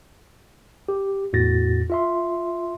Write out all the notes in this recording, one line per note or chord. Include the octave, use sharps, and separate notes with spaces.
G4
E2 A2 F#4 A6 A#6
F4 E5 C6